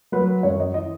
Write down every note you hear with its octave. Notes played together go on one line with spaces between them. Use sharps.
F#3 B4
F#2 C#5
D#5
E3 D#5